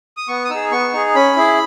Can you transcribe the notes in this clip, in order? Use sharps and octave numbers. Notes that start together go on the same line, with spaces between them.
D#6
B3 C#6
D#6
D#4 G#4 E6
B3 C#6
D#4 G#4
C#4 B5
E4 G#4